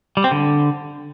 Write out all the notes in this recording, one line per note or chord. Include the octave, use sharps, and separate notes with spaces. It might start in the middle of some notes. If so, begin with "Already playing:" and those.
G3
C4
D3